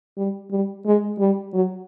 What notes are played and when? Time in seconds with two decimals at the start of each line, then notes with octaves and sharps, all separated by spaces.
0.17 G3
0.51 G3
0.86 G#3
1.19 G3
1.53 F#3